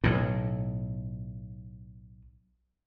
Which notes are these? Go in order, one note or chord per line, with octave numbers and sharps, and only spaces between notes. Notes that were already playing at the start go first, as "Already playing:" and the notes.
B1 A2